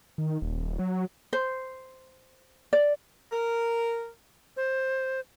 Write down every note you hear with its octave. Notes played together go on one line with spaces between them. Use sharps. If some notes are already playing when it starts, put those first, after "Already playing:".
D#3
D#1
F#3
C5
D5
A#4
C5